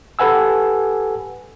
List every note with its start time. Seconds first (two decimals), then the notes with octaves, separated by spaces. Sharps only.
0.19 G4 A4 B4 F#5 G#5 E6